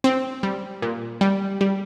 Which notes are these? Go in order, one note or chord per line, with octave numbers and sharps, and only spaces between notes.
C4
G3
A#2
G3
G3